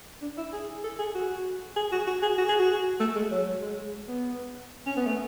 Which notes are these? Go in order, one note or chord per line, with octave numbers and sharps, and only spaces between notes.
D4
E4
G#4
A4
G#4
F#4
G#4
F#4
F#4
G#4
F#4
G#4
F#4
A3
G#3
F#3
G#3
B3
C#4
B3
A3